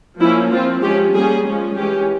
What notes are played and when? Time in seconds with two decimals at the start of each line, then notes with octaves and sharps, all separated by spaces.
0.19 F3 A#3 C#4 E4
0.51 F3 C4 F4
0.82 F3 G#3 C#4 G4
1.13 G3 A#3 C#4 G#4
1.46 F3 G#3 C#4
1.76 E3 G#3 C#4 G4